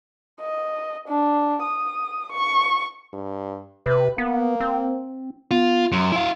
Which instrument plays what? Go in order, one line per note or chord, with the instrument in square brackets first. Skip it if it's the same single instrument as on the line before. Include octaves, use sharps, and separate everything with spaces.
[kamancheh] D#5
D4
D#6
C#6
[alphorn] G2
[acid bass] C3 [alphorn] B4
[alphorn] A#3 [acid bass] B3
[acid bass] C4
[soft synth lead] B3 [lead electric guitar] F4
[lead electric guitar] F#2 [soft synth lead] C6
[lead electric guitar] E4 F5